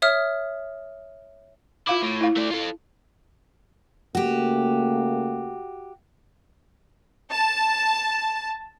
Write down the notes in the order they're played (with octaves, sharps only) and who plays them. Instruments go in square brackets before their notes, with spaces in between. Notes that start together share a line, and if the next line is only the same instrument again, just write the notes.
[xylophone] C#5 E5 D#6 F6
[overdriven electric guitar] E4 [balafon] F4 F5 D6
[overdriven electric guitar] A2
[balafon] E4 F5
[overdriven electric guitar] A3 D5
F4 A4
[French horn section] C#3 A3 A#3 [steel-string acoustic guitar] F#4 G4
[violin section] A5